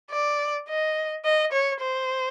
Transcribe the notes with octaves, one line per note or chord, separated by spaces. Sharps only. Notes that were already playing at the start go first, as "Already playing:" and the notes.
D5
D#5
D#5
C#5
C5